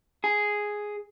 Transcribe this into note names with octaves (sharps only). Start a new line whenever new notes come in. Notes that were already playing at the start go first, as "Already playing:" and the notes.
G#4